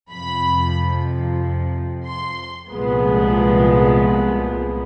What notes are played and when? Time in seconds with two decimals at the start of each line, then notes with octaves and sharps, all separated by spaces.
0.11 F2 C3 F3 B5
2.07 C6
2.71 C2 A#2 F3 G#3 B3